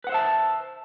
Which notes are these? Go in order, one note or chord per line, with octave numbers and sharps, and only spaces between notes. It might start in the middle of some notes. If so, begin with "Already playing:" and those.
B4 C5 E5 F#5 A5